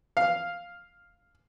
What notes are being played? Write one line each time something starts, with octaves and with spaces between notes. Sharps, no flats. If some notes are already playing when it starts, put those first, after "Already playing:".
F5